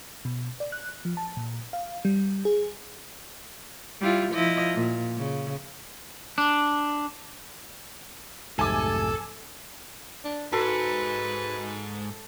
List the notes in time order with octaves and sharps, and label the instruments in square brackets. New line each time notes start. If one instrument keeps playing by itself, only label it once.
[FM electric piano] B2
D5
F#6
F3
A5
A#2
F5
G3
G#4
[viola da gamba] G3 E4 F4
F3 E4 D#5
A#2
C#3
[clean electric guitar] D4
[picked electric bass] B1 F2 [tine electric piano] G#2 A3 G4 [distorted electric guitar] A4 [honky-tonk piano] G#5 D6
[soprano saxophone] D4
[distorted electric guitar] G#2 [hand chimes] F#4 [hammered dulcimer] A4 [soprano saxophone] B4